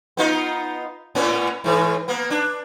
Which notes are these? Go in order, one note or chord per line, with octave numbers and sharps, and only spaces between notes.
B3 D#4 F4
A2 B3 C#4
G#2 E3
A#3 B3
D4